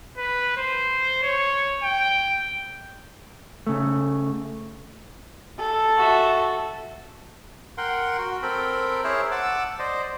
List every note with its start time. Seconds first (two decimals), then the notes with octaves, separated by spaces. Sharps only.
0.18 B4
0.57 C5
1.23 C#5
1.83 G5
3.67 C#3 A3
5.60 A4
5.97 F#4 E5
7.78 A#4 F#5 G5 C6
8.18 F#4
8.43 C4 A4 A#4 G5 B5
9.04 E4 G#4 A#4 C5 C#5 E5
9.32 F#5 A5 D6 E6
9.79 C5 D5 D#5